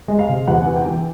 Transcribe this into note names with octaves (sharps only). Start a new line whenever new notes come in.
G#3
F5
C3
E2 F#5
E3
G5
E3